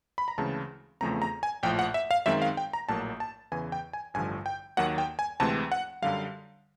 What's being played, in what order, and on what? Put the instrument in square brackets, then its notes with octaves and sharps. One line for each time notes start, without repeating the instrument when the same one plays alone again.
[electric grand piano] B5
A#5
D2 C#3 E3 G#3 C4 A5
E2 C#3 F3 A3 C4 A#5
A#5
G#5
A#1 A2 F3 G5
F#5
E5
F5
F#2 D#3 G#3 C4 E5
F5
G5
A#5
A#1 A2 F#3 A#3 A5
A5
E2 C#3 E3 G#5
G5
G#5
A1 G2 D3 F3 G#5
G5
D#2 D#3 F#3 A#3 F#5
G5
G#5
D2 C3 E3 G#3 C4 A5
F#5
F#2 D3 G3 F5